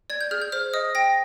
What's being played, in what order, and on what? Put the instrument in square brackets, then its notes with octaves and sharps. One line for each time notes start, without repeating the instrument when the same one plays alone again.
[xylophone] D5 G#6
G6
G#4 F6
G6
C5 F6
D#5 D#6
G5 A#6